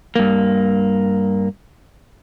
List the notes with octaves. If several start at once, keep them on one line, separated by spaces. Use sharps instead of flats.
G2 A#3